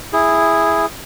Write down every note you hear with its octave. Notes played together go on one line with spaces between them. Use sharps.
E4 G#4